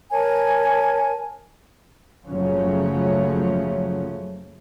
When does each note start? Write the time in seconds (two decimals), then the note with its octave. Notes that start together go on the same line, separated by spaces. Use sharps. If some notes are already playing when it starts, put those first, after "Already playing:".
0.12 A#4 C#5 G#5 A5
2.27 F#1 C#3 F3 F#3 A3 C#4